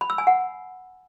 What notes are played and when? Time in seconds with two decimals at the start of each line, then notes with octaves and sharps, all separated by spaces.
0.01 B5
0.10 E6
0.18 G#5
0.27 F#5